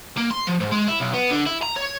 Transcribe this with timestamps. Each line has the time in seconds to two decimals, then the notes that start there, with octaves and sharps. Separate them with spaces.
0.17 A#3
0.31 C6
0.47 F3
0.61 G#2
0.72 G#3
0.88 E4
1.01 B1
1.14 B3
1.31 D3
1.47 E4
1.63 A#5
1.77 C#5